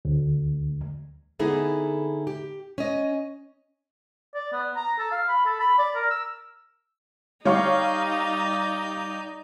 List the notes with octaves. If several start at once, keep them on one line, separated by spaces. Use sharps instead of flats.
D2
D3 B3 D#4 E4 G#4 A4
G4
C#4 D#5
D5
B3
A#5
A4
F5
B5
A4
B5
D5
A#4
E6
G3 D#4 C#5 D5 F5 C#6 G6